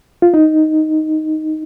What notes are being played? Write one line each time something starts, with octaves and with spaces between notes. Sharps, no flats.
F4
D#4